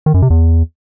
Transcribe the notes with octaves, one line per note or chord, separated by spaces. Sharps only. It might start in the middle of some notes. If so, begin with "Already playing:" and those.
D#3
F#2
C3
E2